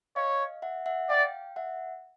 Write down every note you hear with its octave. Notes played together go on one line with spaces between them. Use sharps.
C#5 D#5 F5
E5 F#5
E5 F#5
D5 F5 G5
E5 F#5